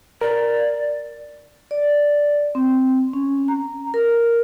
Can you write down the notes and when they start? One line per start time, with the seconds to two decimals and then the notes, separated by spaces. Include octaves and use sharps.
0.21 A#4 D5
1.71 D5
2.55 C4
3.13 C#4
3.48 A#5
3.94 A#4